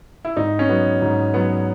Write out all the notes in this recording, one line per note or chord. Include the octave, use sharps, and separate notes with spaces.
E4
G#2 D#4
C#4
F#3 B3
G#2
F#3 B3